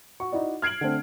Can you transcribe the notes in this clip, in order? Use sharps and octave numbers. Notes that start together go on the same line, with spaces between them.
F#4 C#6
D#4 E4 F#4 D5
F6 G#6 C7 D7 F#7
D3 A3 C4